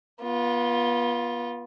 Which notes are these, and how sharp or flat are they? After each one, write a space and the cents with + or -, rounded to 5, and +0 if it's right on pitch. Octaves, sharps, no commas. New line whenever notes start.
B3 -30 F4 +0